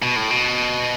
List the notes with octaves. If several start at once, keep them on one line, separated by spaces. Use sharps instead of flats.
B2
A2
B2